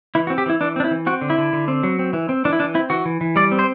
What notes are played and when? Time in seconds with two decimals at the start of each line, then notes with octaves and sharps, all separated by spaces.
0.15 E3 E4
0.27 F#4
0.30 C4
0.38 G4
0.46 E3 E4
0.61 E3 D4
0.76 C4 D4
0.84 E4
0.91 E3
1.07 C4 F#4
1.22 D3
1.30 E4
1.38 D3
1.53 D3
1.68 C4
1.83 F#3
1.99 C4
2.13 E3
2.29 C4
2.45 E3 D4
2.53 E4
2.59 E3 D4
2.74 C4 E4
2.90 E3 F#4
3.05 E3
3.21 E3
3.36 G3 D5
3.52 C4
3.59 C5